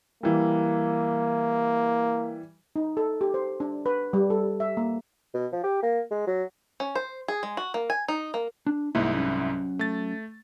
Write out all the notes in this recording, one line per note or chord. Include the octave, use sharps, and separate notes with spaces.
E3 G3 A#3
D#4
A4
G4
C5
D4
B4
G3
A4
E5
A#3
B2
F3
G4
A#3
G#3
F#3
C#4
C5
G#4
G#3
F#4
A#3
G#5
D#4
A#3
D4
C2 G#2 A#3 E4 E5
F#3 C#4
A3 A6